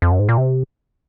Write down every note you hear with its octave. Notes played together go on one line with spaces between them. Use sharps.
F2
F#2
G#2
A#2
C3